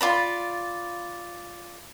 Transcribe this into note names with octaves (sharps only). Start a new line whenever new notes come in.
F4 D5 B5